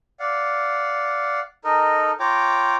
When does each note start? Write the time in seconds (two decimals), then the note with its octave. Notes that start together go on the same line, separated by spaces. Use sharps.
0.20 D5 F5 F#5
1.64 D#4 A4 A#4 D#5
2.20 F4 C#5 G5 A#5 D6